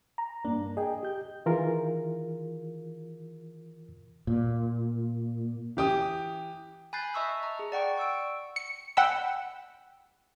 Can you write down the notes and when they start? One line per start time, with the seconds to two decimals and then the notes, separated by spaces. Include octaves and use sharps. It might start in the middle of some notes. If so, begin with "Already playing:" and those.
0.18 A#5
0.45 G2 A#3 D4
0.77 G#4 D#5 G5
1.03 G4 G6
1.46 D#3 E3 F4 G#4 A#4
4.27 A#2
5.77 E3 G4 D#6
6.93 G#5 B5 F#6 G6 A6 C7
7.14 D#5 E5 A5 C#6 D#6 E6
7.43 A#5
7.59 G#4
7.72 D5 F#5 G5 C#6
7.97 C#6 E6 D7
8.56 C#7
8.97 F#5 G5 B5 E6